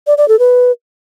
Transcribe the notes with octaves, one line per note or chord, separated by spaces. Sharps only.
D5
D5
A4
B4